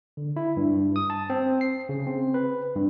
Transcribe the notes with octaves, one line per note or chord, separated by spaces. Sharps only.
D3
E4
G2
D#6
A5
C4
C7
C#3
C4
B4
G2